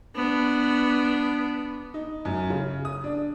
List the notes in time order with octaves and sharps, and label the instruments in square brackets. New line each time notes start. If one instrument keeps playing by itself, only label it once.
[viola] B3 D4
[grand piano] D#4
F#2
C#3
D#6
D4